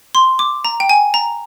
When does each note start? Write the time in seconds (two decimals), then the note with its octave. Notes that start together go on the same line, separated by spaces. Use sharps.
0.15 C6
0.39 D6
0.65 A#5
0.80 G5
0.89 G#5
1.14 A#5